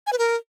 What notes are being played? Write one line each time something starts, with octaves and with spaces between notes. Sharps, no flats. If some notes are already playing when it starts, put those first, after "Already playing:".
G#5
B4
A#4